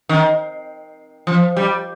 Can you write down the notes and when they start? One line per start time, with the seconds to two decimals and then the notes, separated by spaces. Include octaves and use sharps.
0.09 D#3
1.27 F3
1.57 G3